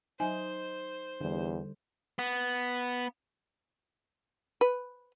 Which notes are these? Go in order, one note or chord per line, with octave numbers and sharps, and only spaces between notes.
F#3 D#4 C5 G#5
E2 D3 G3
B3
B4